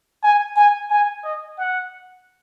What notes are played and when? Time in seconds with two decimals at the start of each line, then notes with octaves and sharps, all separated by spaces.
0.23 G#5
0.56 G#5
0.90 G#5
1.24 D#5
1.58 F#5